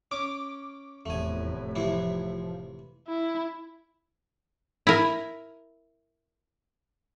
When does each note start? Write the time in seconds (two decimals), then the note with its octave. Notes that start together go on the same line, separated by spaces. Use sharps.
0.11 C#4 D6
1.06 F1 E2 A2 A3 G#5
1.76 C3 E3 F3 E4
3.08 E4
4.87 E4 A#4